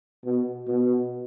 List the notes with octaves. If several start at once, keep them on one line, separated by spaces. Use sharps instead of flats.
B2
B2